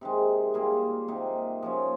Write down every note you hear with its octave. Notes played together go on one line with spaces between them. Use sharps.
C3 D#3 G#3
G3 A#3 F4 G#4
C3 D#3 A#3
F3 A#3 C#4